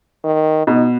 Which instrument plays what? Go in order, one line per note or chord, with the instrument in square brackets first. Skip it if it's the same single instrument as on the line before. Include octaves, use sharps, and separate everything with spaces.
[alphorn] D#3
[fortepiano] B2 [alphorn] D#4